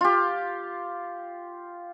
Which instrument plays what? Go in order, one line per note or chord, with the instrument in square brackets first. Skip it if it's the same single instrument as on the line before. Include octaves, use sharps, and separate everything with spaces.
[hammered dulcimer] F4 G4